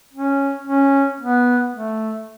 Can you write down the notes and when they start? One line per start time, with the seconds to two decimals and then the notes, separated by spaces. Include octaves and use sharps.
0.14 C#4
0.67 C#4
1.20 B3
1.73 A3